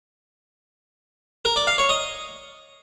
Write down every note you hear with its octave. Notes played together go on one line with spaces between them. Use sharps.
A#4
D5
F5
C#5
D#5